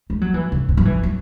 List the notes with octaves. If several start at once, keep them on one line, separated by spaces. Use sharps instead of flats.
G#3
F#3
E3
C#3
G#2
F#3
E3
F#3